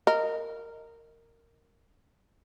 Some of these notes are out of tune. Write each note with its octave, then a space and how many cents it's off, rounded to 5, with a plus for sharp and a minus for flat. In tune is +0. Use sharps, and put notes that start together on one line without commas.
A#4 -15 D#5 +0